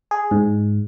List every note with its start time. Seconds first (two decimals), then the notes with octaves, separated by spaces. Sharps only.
0.11 G#4
0.31 G#2